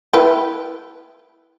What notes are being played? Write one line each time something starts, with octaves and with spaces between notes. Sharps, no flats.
E4 B4 G5